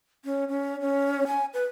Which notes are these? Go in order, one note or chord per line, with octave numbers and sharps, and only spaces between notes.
C#4
C#4
C#4
G#5
B4